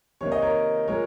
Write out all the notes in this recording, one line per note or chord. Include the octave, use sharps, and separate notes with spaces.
C3 D#3 A#3 C#5
D#5
A#4 C#5
A#2 G#3 A#4 C#5